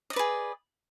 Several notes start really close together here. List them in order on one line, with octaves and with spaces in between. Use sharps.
D#5 D5 B4 G#4